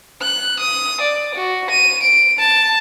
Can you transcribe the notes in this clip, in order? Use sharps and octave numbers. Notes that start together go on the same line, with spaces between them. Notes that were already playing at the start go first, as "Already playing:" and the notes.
F#6
D#6
D5
F#4
D#7
D7
A5